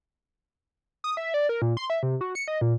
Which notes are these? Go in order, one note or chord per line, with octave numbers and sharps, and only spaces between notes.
D#6
E5
D5
A#4
A#2
C6
E5
C3
F#4
C#7
D#5
A#2